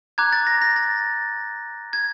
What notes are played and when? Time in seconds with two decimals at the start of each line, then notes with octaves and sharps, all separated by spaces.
0.18 A#5 D6 F#6 G#6
0.32 A6
0.47 A#6
0.62 A#6
0.76 A6
1.93 G#6